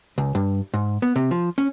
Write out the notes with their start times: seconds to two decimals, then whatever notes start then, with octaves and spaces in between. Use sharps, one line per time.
0.18 C#2
0.35 G2
0.74 G#2
1.02 B3
1.16 C3
1.31 F3
1.58 C#4